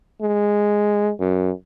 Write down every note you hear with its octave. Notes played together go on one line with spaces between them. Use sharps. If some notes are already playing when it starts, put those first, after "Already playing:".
G#3
F#2